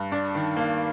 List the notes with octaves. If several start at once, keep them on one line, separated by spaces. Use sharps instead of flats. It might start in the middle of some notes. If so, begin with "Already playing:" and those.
Already playing: G2
D4
D#3
A#3